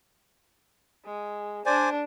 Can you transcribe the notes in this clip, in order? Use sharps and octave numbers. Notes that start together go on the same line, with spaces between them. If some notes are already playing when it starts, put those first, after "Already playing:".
G#3
D4 C5 D5 G#5